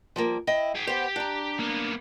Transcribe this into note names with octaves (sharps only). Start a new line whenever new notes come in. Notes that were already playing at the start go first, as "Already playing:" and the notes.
F3 G3 A#3
E4 D#5 G5
G#4 G5
B3 G4 C5
D4 A#5
A#3 B3